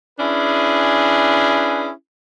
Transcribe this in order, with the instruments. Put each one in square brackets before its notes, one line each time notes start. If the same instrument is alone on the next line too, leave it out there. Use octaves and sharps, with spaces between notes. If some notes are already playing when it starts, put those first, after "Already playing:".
[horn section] C#4 D4 E4 G#4 B4